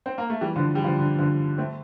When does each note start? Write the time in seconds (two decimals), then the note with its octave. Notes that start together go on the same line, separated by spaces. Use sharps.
0.06 C4
0.18 A#3
0.30 A3
0.41 E3 G3
0.56 D3 F3
0.75 G3
0.84 D3 F3
0.99 D3
1.18 D3 F3
1.58 A3 C4